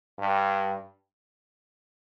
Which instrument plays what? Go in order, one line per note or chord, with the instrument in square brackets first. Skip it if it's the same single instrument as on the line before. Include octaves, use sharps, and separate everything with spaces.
[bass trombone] G2